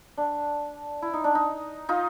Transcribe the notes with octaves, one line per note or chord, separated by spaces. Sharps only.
D4
E4
D#4
D4
D#4
D#4 F4